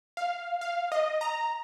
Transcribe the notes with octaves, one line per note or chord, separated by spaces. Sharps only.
F5
F5
D#5
A#5